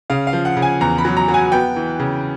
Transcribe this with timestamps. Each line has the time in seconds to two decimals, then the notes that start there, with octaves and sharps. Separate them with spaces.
0.10 C#3 F5
0.27 F5
0.33 F3
0.45 F#5
0.57 C#3
0.62 G#5
0.81 E2 A#5
0.98 B5
1.05 F#3
1.17 A#5
1.28 F#3
1.34 G#5
1.52 B3 G5
1.76 E3
2.00 C#3